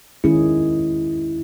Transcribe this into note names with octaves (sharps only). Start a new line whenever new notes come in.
D#3 G#3 C#4 E4 G#4